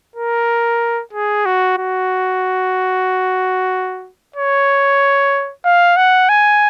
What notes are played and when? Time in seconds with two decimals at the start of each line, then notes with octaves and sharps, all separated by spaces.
0.16 A#4
1.13 G#4
1.45 F#4
1.78 F#4
4.36 C#5
5.65 F5
5.97 F#5
6.29 G#5